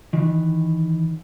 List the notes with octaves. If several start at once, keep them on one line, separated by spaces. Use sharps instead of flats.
D#3 E3